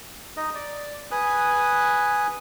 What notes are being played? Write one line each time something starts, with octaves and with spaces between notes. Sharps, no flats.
D#4 D#5
D5
B4 G#5 D#6 F#6